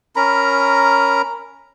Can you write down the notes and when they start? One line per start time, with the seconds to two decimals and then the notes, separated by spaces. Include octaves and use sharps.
0.16 C#4 A#4 A#5 B5